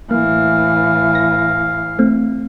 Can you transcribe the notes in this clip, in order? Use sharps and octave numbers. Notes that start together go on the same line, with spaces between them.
A2 E3 A#3 F5
A#6
A3 C4